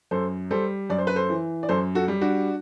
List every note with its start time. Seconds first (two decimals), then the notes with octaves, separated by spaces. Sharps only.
0.11 F#2 A4 C5
0.51 G3 A4 C5
0.90 F#2 D5
0.98 C5
1.07 B4
1.15 A4 C5
1.30 E3
1.63 D5
1.69 F#2 A4 C5
1.95 F#4 A4
2.08 G3
2.21 D4 F#4